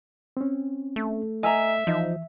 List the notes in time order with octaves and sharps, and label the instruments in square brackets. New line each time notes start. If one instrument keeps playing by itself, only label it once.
[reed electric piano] C4 C#4
[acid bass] A3
[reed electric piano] D#5 E6 [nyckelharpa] E5 [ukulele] G#5 A#5
[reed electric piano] E3 [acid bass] F3 [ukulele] D#4